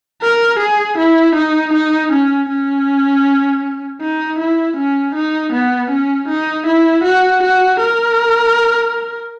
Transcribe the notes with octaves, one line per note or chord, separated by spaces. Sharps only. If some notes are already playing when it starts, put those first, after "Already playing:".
A#4
G#4
E4
D#4
D#4
C#4
C#4
D#4
E4
C#4
D#4
B3
C#4
D#4
E4
F#4
F#4
A#4